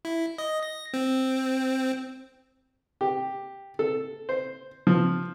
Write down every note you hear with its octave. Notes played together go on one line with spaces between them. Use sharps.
E4
D#5
A#6
C4
G4
A4
C5
F3